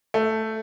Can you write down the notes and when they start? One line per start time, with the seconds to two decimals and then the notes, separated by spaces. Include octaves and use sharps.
0.14 A3